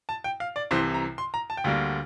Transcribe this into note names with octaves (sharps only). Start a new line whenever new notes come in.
A5
G5
F5
D5
C2 C3 E3 C5
A#5
C6
A#5
A5
G5
D2 D3 G3 A#3 F5